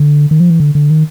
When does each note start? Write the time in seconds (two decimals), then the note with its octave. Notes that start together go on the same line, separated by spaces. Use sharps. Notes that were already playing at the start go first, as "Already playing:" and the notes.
Already playing: D3
0.31 D#3
0.40 F3
0.50 E3
0.60 D3
0.75 D3
0.90 D#3